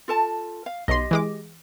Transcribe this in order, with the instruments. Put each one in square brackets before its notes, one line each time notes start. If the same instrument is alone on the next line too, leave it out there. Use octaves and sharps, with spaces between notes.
[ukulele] F4 A4 A5
F5
[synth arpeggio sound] B1 C6 [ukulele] G4 D#5
[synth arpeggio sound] E3 G#3 D6